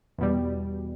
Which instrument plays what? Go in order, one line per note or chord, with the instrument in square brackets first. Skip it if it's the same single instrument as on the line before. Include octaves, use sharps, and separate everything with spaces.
[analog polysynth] E2 B2 G3